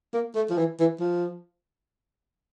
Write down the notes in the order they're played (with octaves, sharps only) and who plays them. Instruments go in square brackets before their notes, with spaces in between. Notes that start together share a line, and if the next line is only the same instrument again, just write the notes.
[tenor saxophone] A#3
A3
F3
E3
E3
F3